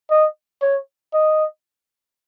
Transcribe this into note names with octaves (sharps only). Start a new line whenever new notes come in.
D#5
C#5
D#5